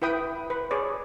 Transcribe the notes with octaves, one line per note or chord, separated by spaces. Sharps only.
E4 B4 G5 D#6
B4
G#4 C#5 D5